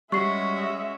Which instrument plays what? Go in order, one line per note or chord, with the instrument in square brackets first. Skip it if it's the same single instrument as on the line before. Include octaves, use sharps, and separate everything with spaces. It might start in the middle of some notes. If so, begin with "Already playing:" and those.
[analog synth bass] G3 [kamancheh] G#3 E5 [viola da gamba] C#4 F#4 [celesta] C#6 C7